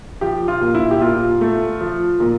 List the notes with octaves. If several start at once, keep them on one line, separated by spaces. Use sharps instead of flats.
F3 G4
F4
A#2
E4
G4
A#2 F4
A3
F3
A#2